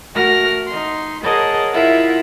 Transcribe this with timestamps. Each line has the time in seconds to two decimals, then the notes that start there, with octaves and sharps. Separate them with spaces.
0.14 A3 F#4 A#4 F6 A#6
0.69 D#4 C6
1.23 G#4 A#4 C#5 D#5 F#5 A5
1.73 E4 F4 A#4 E5 F#5